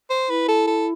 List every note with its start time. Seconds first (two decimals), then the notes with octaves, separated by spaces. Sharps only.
0.10 C5
0.29 E4 B4
0.48 A4
0.67 A4